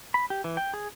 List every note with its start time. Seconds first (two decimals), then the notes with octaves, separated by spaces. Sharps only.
0.14 B5
0.30 G4
0.44 E3
0.57 G5
0.74 G#4